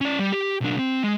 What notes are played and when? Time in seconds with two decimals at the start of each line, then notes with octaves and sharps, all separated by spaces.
0.01 C#4 D5
0.19 G3
0.32 G4
0.61 B1 D4
0.79 C4
1.03 G#3